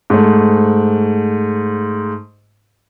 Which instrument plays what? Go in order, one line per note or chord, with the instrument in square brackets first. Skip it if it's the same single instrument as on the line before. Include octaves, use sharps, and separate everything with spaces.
[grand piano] G#2 A3